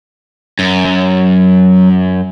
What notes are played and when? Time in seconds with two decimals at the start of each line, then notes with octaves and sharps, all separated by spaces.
0.59 F#2
0.85 F#3